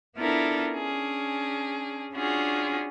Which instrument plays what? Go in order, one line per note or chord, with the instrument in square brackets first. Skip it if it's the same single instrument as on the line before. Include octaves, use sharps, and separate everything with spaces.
[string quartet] B3 D4 E4 F4 A4 A#4
C#4 D4 G#4
C#4 D4 F4 F#4 G#4